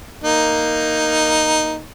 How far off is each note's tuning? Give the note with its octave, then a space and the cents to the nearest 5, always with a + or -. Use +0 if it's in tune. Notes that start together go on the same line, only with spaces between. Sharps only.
A#3 +0 D#4 +0